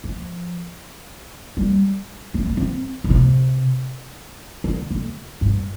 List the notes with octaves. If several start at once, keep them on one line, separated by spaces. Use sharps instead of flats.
F3
G3
C4
D4
C4
D3
C3
D3
D3
G2